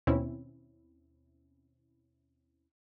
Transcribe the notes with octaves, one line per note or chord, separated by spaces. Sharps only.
D#2 B2 C4 C#4 E4